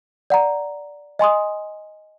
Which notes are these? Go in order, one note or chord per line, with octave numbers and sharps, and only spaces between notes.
D5 F#5 A#5
D#5 G#5 C6 D#6